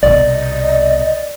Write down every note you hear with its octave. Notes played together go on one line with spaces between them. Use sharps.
C2 B2 D5 D#5